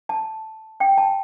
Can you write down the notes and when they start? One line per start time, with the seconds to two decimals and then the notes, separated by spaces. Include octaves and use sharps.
0.09 A5
0.80 G5
0.98 A5